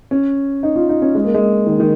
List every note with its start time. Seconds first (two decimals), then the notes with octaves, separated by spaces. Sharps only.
0.11 C#4
0.63 D#4
0.76 F4
0.89 D#4
1.02 C#4
1.15 G#3
1.24 A#3
1.34 G#3
1.66 D#3
1.80 D#3